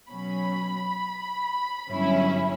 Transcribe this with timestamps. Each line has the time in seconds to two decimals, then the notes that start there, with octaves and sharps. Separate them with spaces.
0.10 B2 F#3 C#4 B5
1.88 G1 G2 F#3 C#4 E4